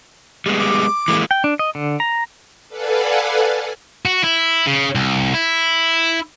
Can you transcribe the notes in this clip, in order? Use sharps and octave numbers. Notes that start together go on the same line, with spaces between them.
G3 G#3 B3
D6
E3 G#3 A#3
G5
D4
D#5
D3
A#5
A4 B4 D5 F5 F#5 G#5
F#4
E4
C#3
C2
E4